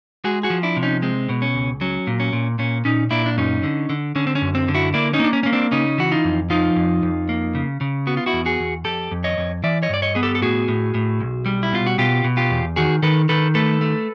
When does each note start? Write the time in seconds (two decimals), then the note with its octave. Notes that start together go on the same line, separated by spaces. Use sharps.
0.24 G#3 F#4 G#4
0.43 F#4 G#4
0.50 F3
0.63 D4 E4
0.77 C3
0.83 C#4 D#4
1.02 G#3 C4
1.29 B2
1.42 C#4
1.55 C#2
1.81 F#3 C#4
2.07 A#2
2.20 C#4
2.33 A#2
2.59 A#2 C#4
2.85 A#2 C#4 D#4
3.11 A#2 D4 E4
3.26 D4
3.38 F#2 C#4 D#4
3.63 D3
3.89 D3
4.15 D3 C#4
4.27 C4
4.35 C#4
4.42 F#2
4.55 C4
4.68 D3
4.75 E4 F#4
4.94 A#3 D4 E4
5.13 C#4 D#4
5.19 A#3 D4
5.33 C#4
5.43 A#3 C#4
5.53 C4 D4
5.71 C#3 C#4 D#4
5.98 E3 F#4
6.12 D#4 F4
6.25 F2
6.50 F3 D#4 F4
6.76 F2
7.03 F2
7.29 A#3
7.55 C#3
7.81 C#3
8.07 B3 F#4
8.17 F4
8.26 E4 F#4
8.33 E2
8.46 F#4 G#4
8.59 E2
8.85 F2 G4 A4
9.11 F2
9.24 C#5 D#5
9.38 F2
9.64 E3 D5 E5
9.83 C#5 D#5
9.90 G2 D5
10.02 C#5 D#5
10.15 B3 G#4
10.23 G4 A4
10.35 A4
10.42 A2 F#4 G#4
10.68 A2
10.94 A2
11.20 B1
11.46 G3
11.63 E4
11.73 B2 F4
11.86 F#4
11.98 B2 F4 G4
12.24 B2
12.37 F4 G4
12.51 E2
12.76 D#3 F#4 G#4
13.03 D#3 A4 B4
13.29 D#3 A4 B4
13.55 A3 A4 B4
13.81 A3